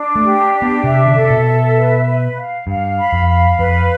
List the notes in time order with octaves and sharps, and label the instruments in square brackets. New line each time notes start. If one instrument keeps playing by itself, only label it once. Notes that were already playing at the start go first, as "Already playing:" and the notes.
Already playing: [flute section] D4
[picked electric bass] A3
[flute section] G4
D4
[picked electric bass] B3
[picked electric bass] C3 [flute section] E5
[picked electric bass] D3
[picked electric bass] C3 [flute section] A4
[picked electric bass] B2
[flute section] E5
B4
B4
F5
[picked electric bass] G2 [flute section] F5
[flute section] B5
[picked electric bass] F2
[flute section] F5
[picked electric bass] F2 [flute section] B4